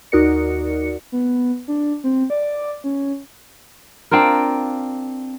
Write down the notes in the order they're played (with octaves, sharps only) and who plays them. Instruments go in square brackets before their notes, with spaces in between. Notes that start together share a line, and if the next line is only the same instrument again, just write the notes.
[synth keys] D#2 D#4 F#4 A#4 D5 C#7
[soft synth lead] B3
D4
C4
D5
C#4
[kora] C4 D4 F4 A#4